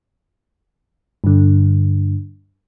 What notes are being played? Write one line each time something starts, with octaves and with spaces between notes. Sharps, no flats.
G2 D3